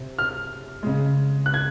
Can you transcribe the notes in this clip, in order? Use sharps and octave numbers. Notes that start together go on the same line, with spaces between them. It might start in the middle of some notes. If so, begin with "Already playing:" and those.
Already playing: C3
F6
C#3 G#3
F#6
G#6